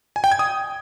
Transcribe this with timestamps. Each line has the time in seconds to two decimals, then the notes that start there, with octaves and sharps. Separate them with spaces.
0.16 G#5
0.24 G5
0.32 G#6
0.39 D#6